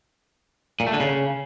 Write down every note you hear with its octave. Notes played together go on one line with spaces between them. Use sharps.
A#2
A3
D3
C#3